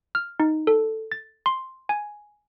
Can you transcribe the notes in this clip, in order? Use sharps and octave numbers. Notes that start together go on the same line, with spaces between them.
F6
D#4
A4
A6
C6
G#5